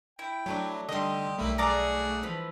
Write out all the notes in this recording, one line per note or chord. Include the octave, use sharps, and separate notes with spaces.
E4 G5
F#3 A3 D4 F#4
D3 G3 D#4 G4 D#5 C6
B1 A3 A#3 E4 B5
F#4 G#4 A4 D5 F5 A#5
E3 F3 B5